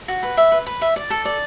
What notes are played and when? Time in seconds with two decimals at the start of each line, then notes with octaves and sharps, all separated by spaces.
0.08 F#4
0.23 B4
0.37 E5
0.52 B4
0.66 B4
0.81 E5
0.96 D5
1.10 A4
1.25 D5